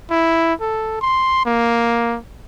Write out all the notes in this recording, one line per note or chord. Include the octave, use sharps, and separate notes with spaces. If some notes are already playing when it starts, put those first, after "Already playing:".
E4
A4
C6
A#3